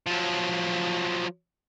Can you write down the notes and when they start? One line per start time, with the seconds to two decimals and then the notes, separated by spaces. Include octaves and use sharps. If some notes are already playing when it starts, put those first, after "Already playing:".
0.07 F3 F#3